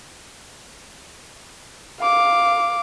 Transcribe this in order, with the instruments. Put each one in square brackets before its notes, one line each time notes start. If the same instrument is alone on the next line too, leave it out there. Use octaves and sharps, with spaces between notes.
[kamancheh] F5 D6